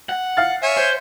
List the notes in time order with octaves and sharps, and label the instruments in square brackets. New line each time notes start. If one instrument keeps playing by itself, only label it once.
[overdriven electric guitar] F#5
[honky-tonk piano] F5 F6 A6
[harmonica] C#5 E5 G#5
[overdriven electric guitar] C5